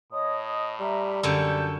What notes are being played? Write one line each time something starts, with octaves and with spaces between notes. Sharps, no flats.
A2 C#5 D#5 D#6
G3 E5 A#5
F#2 D3 A4 G6